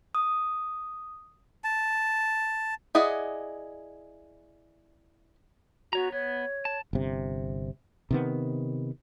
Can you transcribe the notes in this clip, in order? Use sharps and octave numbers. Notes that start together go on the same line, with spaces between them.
D#6
A5
E4 G#4 D5 D#5 F#5
B3 F#4 C#5 A#5
B3 C#5
A5
G1 C3
C3 D#3 B3